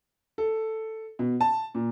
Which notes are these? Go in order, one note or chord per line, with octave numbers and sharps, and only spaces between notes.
A4
B2
A5
A#2